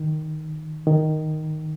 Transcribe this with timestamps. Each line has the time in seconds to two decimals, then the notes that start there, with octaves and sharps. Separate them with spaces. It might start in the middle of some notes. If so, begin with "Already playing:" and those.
Already playing: D#3
0.87 D#3